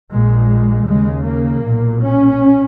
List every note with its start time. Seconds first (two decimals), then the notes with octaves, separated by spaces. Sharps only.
0.13 A#1 A#2 G#3
0.88 D#2 C#3 G#3
1.25 A#3
1.63 B1 A#2
2.01 C#4